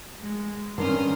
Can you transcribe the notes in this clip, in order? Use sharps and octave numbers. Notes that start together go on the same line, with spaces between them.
G#3
G2 D#3 C#4 C6 D#6 F6